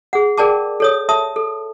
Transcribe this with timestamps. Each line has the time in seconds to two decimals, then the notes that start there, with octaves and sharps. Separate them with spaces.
0.13 G#4 F#5
0.38 G#4 A#4 D5 G5 A5 D6
0.80 A4 C#5 D#6
1.09 E5 A5 D#6
1.36 A4